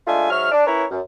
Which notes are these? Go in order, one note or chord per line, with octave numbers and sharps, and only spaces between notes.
G#3 A3 D4 F4 E5 G#5
G#2 F#3 E5 C#6 F6
D4
C#4 E4 A#4 B4 C#5
F#2